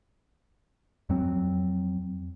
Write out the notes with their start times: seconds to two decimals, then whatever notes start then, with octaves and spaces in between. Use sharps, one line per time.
1.09 F2 F#3 C4